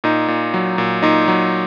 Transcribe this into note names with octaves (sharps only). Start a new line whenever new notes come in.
A#2 D#4
A#2
F#3
A#2
A#2 D#4
F#3